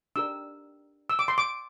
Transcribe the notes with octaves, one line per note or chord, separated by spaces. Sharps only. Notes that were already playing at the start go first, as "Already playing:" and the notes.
D4 G4 A#4 E6
E6
D6
C6
D6